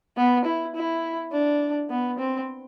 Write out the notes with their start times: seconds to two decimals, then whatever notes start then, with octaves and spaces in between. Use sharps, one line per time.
0.17 B3
0.45 E4
0.76 E4
1.32 D4
1.90 B3
2.19 C4